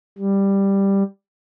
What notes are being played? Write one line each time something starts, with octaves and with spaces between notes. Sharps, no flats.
G3